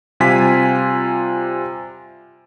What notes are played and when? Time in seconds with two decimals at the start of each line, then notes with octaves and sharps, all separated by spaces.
0.20 C3 G3 F4 G#5 B6